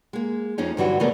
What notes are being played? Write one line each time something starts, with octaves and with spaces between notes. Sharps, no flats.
G#3 A#3
F2 F3 C#4 D#4
G2 D3 E3 F#3 G3 F#4
C#3 E3 A3 B3 A#4 D5